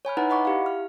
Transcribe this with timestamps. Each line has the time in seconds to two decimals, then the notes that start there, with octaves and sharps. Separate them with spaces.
0.05 C#5 G#5 B5 F6
0.17 D#4 E4 B4 F#5 A#5
0.30 D#5 F#5 B5 C#6 D6
0.45 E4 G4 F5
0.66 F6